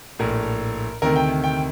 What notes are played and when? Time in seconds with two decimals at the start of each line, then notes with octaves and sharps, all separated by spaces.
0.19 A#1 A2 A#4
1.02 D2 C3 D#3 A#4
1.16 G5
1.44 G5